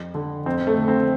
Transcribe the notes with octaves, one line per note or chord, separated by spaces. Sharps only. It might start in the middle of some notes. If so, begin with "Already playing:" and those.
Already playing: F2
D3
F2 C4
A3
D3
C4